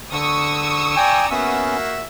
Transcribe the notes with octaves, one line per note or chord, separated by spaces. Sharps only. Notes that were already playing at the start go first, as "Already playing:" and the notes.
D3 C#6 D#6 E6
D5 G5 G#5 A#5
A#3 B3 C#4 F#4 E5